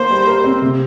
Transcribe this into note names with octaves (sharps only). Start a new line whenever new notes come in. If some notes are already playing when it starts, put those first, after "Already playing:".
Already playing: A#3 C5
G3
A#4
C4
C3